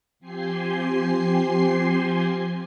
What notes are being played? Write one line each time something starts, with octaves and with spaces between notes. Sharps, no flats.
F3 C4 G4 G#5 C6 C7